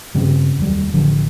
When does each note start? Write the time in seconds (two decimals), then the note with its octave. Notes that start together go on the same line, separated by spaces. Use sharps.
0.14 G2 C#3 C4
0.58 F1 D#2 C3 G3
0.94 A1 D3 F3